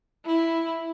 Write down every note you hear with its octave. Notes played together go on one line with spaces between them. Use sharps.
E4